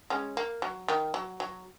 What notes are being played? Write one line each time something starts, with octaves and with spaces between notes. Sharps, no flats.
G#3 C#4
A#3
F#3
D#3
F#3
F#3